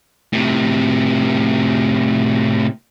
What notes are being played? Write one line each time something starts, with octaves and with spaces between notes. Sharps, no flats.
A2 C3